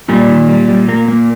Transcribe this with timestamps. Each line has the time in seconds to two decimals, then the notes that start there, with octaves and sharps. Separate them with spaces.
0.08 A#2 G3
0.28 D#3
0.48 G3
0.69 G3
0.89 A#3
1.08 A#3